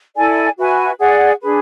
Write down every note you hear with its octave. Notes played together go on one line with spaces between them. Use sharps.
E4 A4 D5 G#5
F#4 B4 E5 G#5
G#4 D5 F#5
D4 G#4 B4